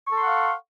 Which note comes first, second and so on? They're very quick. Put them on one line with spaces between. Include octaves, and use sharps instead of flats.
C#6 A4 C6 F#5 F5